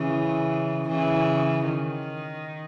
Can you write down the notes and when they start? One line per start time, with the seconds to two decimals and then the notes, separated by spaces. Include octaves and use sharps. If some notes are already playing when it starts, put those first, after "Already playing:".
Already playing: C#3 E3
0.88 C#3 E3
1.65 D#3